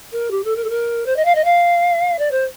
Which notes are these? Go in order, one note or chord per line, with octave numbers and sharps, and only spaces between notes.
A#4
G4
A4
A#4
A4
A#4
C5
D#5
F5
D#5
F5
D5
C5